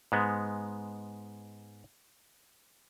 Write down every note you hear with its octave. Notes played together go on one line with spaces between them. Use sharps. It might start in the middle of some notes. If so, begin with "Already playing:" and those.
G#2 G#3 B3